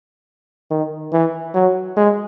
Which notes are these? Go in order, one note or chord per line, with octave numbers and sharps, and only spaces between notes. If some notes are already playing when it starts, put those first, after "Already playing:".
D#3
E3
F#3
G#3